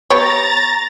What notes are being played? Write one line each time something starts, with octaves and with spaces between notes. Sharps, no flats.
B3 G4 C#5 A#5 A6